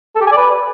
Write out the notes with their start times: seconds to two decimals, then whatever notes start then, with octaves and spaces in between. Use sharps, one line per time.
0.15 A4
0.21 G4
0.26 G#5
0.32 D5
0.37 B4